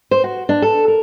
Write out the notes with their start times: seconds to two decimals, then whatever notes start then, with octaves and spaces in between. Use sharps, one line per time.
0.11 C5
0.24 F#4
0.49 D4
0.62 A4
0.88 A#4